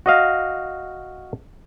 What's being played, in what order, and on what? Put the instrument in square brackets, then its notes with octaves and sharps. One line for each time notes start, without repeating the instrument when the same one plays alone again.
[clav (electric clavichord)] F#4 D#5 F5